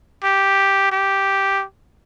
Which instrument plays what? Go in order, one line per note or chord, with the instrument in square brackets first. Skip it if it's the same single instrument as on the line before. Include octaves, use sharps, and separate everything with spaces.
[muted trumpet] G4
G4